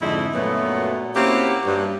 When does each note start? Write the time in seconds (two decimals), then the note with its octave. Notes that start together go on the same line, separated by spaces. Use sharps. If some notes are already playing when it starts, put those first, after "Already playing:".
0.01 F2 G#2 D3 G#3 D#4 E4
0.34 F#2 A#2 F#3 A3 B3
1.16 A#3 C4 C#4 E4 F#4 G4
1.66 G2